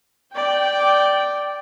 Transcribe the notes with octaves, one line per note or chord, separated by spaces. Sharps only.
D5 G5